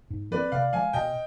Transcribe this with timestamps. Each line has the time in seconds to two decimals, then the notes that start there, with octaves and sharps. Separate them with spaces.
0.10 G#2
0.31 F3 C4 B4 D5
0.52 C3 D5 F5
0.73 F3 G#3 F5 G#5
0.93 B2 D#5 G5